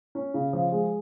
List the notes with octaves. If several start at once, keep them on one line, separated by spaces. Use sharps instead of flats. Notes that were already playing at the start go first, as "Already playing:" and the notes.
C#4
C#3
F3
G#3